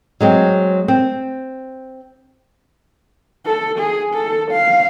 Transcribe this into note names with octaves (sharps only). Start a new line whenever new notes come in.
F#3 G#3 C4
C4
A4
G#4
A4
F5